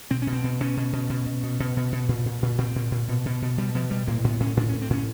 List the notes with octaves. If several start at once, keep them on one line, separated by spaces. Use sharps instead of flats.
B2 C4
B2 C#4
C4
B2
B2 C#4
B2
B2
B2
B2
B2
B2
B2
B2
A#2
A#2
A#2
A#2 C4
A#2
A#2
B2
B2
B2
B2 G3
B2 F3
B2 G3
A2 A#3
A2 B3
A2 C#4
A2 D4
C#4
A2
C4
A2 C#4